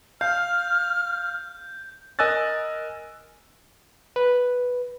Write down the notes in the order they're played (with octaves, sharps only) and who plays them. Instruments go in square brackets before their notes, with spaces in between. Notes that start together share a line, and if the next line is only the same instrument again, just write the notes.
[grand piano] F5 [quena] F6 [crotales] G6
[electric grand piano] A#4 D#5 G#5 E6 F#6 A6
[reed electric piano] B4